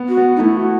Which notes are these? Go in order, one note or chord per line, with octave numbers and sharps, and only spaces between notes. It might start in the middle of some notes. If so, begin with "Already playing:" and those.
Already playing: B3
F#4
B3
D#4
A3 E4
F#4